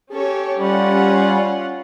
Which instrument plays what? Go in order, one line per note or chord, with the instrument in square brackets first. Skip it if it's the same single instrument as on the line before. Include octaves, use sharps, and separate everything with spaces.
[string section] C#4 A4 C#5 [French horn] G4
[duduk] G3 [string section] C#4 F4 F#5